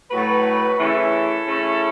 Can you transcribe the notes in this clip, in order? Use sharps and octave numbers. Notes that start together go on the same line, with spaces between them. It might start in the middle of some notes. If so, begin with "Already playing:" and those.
A2 F#3 A3 F#4 B4
C#3 E3 A3 C#4 E4 A4
C#3 A3 C#4